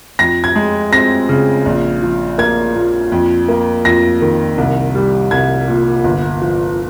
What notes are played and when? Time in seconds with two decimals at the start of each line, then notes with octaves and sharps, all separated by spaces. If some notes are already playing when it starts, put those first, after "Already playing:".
0.19 F2 A#6
0.44 G#6
0.56 G#3
0.92 C4 A#6
1.29 C#3
1.66 A#1
2.02 F3
2.38 A#3 G#6
2.75 A#2
3.12 F2
3.48 A#3
3.85 F2 A#6
4.22 D#3
4.58 C2
4.95 G3
5.31 C2 G#6
5.68 A#2
6.04 G1
6.41 F3